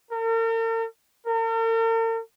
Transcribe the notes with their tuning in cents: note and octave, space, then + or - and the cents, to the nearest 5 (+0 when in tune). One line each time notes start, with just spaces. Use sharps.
A#4 -45
A#4 -45